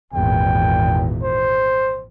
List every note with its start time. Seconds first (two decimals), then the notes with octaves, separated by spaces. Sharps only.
0.13 G#1 E2 A#2 G5
1.23 C5